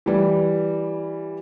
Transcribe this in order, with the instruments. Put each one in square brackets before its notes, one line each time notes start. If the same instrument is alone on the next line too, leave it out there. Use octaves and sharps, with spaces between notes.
[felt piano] E3 G3